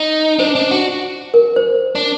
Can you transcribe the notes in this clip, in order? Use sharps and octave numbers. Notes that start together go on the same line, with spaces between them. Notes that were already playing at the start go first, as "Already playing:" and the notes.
Already playing: D#4
D4 C5
D4
F#4
A#4
C5
D4